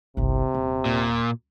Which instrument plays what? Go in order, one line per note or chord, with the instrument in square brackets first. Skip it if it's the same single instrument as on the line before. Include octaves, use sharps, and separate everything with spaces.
[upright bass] G1 C2 [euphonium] C3
[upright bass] D#1
[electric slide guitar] A#2